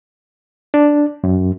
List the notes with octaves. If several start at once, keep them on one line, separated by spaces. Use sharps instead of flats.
D4
F#2